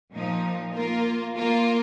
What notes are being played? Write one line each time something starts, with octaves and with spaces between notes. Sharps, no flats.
A#2 F3 D#4
A#3 F4 A#4
A#3 F4 A#4